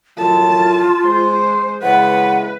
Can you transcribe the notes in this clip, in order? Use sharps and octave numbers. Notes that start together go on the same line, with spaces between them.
F#2 A2 F#3 F4 A5
G#3 C5 C6
C#3 E3 G#3 B4 F#5